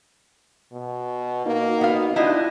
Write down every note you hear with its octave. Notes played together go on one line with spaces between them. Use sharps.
B2
A#3 D#4 F#4
B3 F5
D4 E4 F4 D#5 F#5 G5